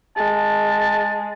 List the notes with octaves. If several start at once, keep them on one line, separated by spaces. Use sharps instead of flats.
G#3 A5